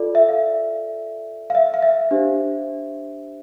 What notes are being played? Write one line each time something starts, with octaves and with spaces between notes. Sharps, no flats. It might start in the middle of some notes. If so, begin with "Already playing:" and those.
Already playing: F4 A4 D5
E5
F5
F5
E5
F5
E5
D4 G4 C5